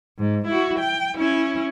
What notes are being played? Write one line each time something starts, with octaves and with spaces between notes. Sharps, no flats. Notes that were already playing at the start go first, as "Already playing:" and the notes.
G#2
E4 F#4
G5
C#4 E4